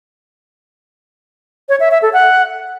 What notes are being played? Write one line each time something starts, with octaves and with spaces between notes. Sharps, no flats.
C#5
E5
E5
A4
F#5